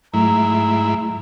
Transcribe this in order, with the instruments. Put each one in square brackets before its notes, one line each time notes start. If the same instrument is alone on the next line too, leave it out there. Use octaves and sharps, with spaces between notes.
[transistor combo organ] G#2 E4 [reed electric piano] F#3 A3 [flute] A#5